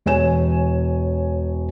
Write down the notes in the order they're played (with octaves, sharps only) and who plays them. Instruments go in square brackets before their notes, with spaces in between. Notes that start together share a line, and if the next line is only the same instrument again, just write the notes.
[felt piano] E1 C#5 G#5 E7